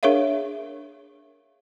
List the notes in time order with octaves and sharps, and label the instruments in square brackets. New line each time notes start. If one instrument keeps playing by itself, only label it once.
[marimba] D4 G#4 A#4 C#5 E5 F5